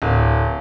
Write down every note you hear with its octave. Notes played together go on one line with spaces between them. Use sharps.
D1